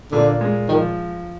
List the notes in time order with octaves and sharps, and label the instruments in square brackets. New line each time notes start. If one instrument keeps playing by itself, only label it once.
[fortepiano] A#2 [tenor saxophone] D3
[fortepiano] G#3
[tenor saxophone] D#3 [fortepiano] F3